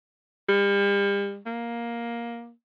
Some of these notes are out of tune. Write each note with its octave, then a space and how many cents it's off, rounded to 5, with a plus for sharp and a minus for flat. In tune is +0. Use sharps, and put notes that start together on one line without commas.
G3 +40
A#3 +10